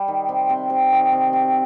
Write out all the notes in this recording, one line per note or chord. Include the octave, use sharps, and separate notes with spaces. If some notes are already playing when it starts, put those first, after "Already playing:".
Already playing: G3
D#3
C3
C3
C3
D#3
C3
C3